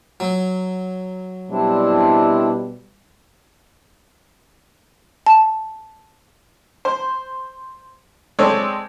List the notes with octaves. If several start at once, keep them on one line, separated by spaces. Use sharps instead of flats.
F#3
B2 G3 C4 D4 E4
A5
C5
G#3 C4 A4 C#5 D5